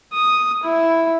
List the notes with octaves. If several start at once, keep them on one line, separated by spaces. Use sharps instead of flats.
D#6
E4